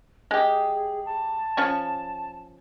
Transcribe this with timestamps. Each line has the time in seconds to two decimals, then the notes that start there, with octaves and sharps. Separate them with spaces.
0.31 G#3 G4 G#4
1.05 A5
1.57 F3 C#4 C#6